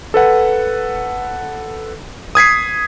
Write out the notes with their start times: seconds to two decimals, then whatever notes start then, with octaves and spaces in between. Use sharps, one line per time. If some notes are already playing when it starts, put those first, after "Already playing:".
0.14 A4 B4 F#5
2.35 D#6 G#6 B6 C7